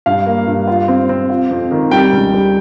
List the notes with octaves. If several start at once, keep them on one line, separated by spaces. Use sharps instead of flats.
G2 F5
A#3
G2
F4
C4
C4
F4
F2
D#3
G3 G5
C#2
G3